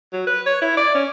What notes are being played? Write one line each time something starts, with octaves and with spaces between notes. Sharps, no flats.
F#3
B4
C#5
E4
D5
C#4